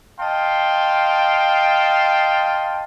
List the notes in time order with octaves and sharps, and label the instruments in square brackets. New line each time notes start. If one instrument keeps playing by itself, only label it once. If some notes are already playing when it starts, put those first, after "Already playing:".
[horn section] D#5 F5 G5 A5 C6